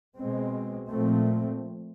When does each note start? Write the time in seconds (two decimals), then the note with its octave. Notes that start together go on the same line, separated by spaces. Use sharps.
0.18 B2 G#3 C4
0.89 A#2 F3 A3 C4